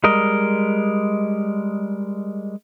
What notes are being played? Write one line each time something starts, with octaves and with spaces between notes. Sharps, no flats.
G3 G#3 A#4 D#5